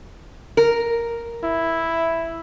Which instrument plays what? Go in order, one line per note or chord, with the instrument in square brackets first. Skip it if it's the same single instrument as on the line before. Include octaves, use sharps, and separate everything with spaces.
[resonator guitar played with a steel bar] A#4
[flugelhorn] E4